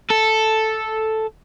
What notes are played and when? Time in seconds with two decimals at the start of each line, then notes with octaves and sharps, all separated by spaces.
0.11 A4